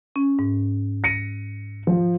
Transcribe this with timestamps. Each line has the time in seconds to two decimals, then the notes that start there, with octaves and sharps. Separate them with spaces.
0.16 C#4
0.39 G#2
1.04 A#6 C#7 D#7
1.87 F3